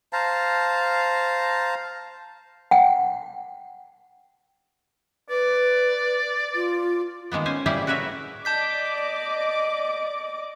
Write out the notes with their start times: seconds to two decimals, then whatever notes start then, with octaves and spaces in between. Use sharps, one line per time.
0.13 C5 F5 A5 A#5
2.71 F#5 G5
5.30 B4 D5
6.55 F4
7.32 D#3 G#3 A#3 B3
7.46 C#4 C5 G#5
7.66 A2 G3 A#3 E4 G4 G#4
7.87 F#4 A#4 B4 C#5 E5
8.45 D5 D#5 A5 D6 G6 B6